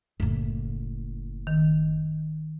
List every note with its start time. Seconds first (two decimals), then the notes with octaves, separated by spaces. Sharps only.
0.20 F#1 A2
1.47 D#3